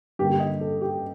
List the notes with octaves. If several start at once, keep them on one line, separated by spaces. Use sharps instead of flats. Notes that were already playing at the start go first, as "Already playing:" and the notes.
G2 D3 G3 A#3 G4
G4
D#5
A4
G4